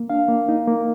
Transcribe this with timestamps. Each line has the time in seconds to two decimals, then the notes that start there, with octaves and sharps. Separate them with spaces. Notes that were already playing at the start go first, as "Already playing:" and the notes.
Already playing: A#3
0.10 D4 F5
0.28 A#3
0.49 D#4
0.67 A#3